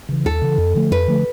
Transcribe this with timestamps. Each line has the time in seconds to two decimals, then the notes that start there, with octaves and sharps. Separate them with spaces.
0.09 C#3 E3
0.25 D#2 A4
0.42 C#3 E3
0.58 F2
0.75 D3 F3 A3
0.91 F2 B4
1.08 D3 F3 A3